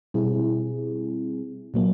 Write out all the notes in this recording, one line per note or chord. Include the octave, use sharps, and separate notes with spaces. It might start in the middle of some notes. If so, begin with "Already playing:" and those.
B2 G3 C4 E4 G#4
A#2 F#3 A#3